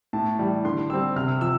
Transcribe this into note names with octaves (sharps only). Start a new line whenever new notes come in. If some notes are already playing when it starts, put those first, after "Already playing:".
A2 A5
E3 G3
D3 C6
G3 C4 E6
C3 F6
F3 E6